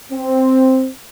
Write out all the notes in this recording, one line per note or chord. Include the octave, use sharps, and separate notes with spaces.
C4